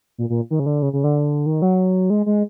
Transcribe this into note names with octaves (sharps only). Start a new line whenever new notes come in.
A#2
A#2
D#3
C#3
D3
C#3
C#3
D3
D#3
F#3
G#3
G#3